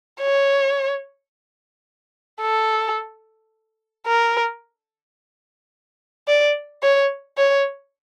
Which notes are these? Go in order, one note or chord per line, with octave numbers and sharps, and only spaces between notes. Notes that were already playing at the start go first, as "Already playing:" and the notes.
C#5
A4
A#4
D5
C#5
C#5